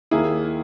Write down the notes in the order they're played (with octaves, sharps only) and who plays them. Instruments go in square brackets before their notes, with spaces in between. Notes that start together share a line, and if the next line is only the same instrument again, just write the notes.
[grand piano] D#2 D#3 A#3 E4 G#4